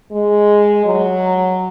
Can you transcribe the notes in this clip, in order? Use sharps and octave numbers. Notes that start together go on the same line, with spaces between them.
G#3
F#3